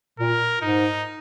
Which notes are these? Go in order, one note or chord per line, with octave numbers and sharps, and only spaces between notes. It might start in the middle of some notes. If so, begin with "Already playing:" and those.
A#2 A#4
G#2 D#4